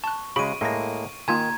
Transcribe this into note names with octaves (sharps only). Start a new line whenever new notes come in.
A5 C#6 F#6
C#3 G#3 F#4 G#4 B5 D7 D#7
A2 G#3 A#3 A4 A#6
D#3 A#3 F4 G#5 A#5 G#6